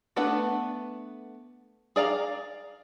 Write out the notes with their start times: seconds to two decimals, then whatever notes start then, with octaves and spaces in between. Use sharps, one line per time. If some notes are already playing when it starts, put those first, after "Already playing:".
0.16 A3 B3 D4 B4 F#5
1.96 G#4 D5 F5 A#5